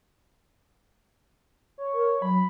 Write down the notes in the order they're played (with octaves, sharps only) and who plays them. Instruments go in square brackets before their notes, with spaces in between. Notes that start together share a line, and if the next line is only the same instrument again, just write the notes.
[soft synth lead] C#5
[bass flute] A#4
[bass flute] F#3 [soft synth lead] B5